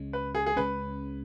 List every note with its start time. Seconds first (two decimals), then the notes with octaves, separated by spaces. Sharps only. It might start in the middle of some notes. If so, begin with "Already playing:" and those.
Already playing: C#2 C#3 G#3 C#4
0.13 B4
0.35 G#4
0.46 G#4
0.56 C#2 C#3 G#3 C#4 B4